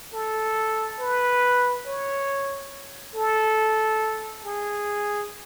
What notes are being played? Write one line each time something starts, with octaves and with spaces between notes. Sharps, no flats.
A4
B4
C#5
A4
G#4